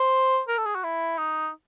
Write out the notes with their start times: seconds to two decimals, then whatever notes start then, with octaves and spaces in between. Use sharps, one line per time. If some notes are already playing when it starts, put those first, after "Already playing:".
Already playing: C5
0.48 A#4
0.58 A4
0.66 G#4
0.75 F#4
0.84 E4
1.18 D#4